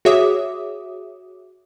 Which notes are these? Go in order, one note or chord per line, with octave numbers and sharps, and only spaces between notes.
F#4 G#4 C#5 E5 D6 D#6